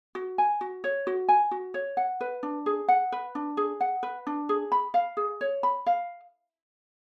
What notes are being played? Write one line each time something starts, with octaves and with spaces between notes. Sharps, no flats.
F#4
G#5
F#4
C#5
F#4
G#5
F#4
C#5
F#5
B4
D4
G#4
F#5
B4
D4
G#4
F#5
B4
D4
G#4
B5
F5
G#4
C#5
B5
F5